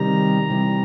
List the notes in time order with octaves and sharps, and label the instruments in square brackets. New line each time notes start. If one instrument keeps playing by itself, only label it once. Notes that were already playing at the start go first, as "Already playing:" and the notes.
Already playing: [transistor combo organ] C3 D#3 G3 A#5
C3 E3 G3